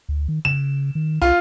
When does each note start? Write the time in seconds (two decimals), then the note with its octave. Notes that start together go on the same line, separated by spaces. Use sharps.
0.09 D2
0.28 D#3
0.45 C#3 E7
0.95 D#3
1.22 C2 F4